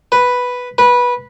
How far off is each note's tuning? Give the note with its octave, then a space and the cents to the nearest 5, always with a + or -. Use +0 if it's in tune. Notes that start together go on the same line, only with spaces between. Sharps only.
B4 +0
B4 -15